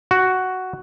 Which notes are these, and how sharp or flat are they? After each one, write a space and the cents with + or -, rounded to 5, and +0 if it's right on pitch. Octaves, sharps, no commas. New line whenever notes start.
F#4 +5